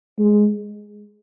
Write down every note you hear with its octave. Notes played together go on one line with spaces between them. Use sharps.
G#3